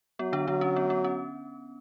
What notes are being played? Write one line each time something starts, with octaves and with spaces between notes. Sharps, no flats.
F#3 B3
D3 D4
D3 F#3 D4
C#4
B3
B3
C#4